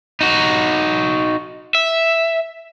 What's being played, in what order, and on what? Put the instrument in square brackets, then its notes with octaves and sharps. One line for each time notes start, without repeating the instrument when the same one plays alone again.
[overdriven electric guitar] D#4 F#4
E5